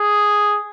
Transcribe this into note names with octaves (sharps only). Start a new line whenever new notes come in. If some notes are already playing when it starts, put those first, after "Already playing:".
Already playing: G#4